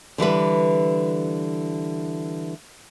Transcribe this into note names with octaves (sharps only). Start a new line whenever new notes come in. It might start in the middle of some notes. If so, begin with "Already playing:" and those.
D3 E3 G3 B4